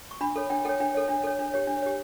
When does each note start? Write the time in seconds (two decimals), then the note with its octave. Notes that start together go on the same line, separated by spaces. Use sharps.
0.11 C#6
0.21 D4 B5
0.36 A4 C#5
0.50 D4 G5
0.65 A4 C#5 G5
0.80 D4 G5
0.95 A4 C#5
1.09 D4
1.23 A4 C#5
1.39 D4
1.54 G4 C#5
1.67 D4
1.82 G4 C#5